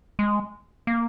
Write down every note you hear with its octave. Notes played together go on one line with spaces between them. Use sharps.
G#3
A#3